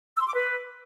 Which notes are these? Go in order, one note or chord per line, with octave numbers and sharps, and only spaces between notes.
E6
C6
D6
B4